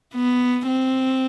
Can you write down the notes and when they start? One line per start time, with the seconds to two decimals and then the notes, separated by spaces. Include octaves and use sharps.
0.15 B3
0.68 C4